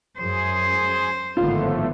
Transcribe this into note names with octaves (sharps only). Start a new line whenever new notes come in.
F#2 G#4 C5
G#1 A2 D3 F3 A3 B3 F4